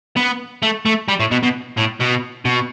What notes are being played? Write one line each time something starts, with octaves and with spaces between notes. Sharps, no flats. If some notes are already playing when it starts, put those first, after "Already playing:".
B3
A3
A3
G3
A2
B2
B2
A2
B2
B2